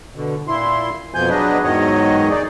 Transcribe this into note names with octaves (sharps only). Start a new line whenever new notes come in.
B2 D3
A#2 E4 C6
F2 B2 F3 G#5 G6
F#3 B3 D4 G#4 B4 D#5
E2 G#2 D#3 F#3 C#5 D#5
D#4 G#4 D5